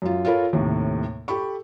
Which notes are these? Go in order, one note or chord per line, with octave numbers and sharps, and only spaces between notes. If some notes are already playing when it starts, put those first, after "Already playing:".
F#2 F4
F4 A4 A#4 C#5 B5
D#2 A2 C3
G4 A4 B5 C#6